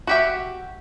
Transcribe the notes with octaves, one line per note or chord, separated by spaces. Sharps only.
F#4 G4 E5